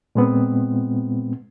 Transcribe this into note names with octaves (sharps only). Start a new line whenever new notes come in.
A#2 G#3 B3 C4